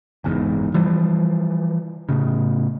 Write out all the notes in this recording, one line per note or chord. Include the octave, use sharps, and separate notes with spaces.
F#1 E2 G#2
E3 F3 G3
A2 C#3